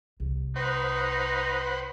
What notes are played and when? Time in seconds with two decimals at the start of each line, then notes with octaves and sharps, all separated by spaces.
0.20 C2
0.56 D#4 B4 C5 F#5